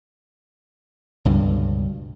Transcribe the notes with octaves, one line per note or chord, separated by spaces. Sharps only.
C#2 G2 B2 D3